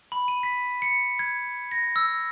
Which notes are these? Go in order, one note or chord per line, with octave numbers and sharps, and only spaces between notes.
B5
D#7
B6
C#7
G#6
A#6
E6